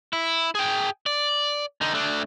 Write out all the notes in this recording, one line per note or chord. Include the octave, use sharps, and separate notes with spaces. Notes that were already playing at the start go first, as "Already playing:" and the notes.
E4
G#4 G5
D5
D3 D#4
A3 D4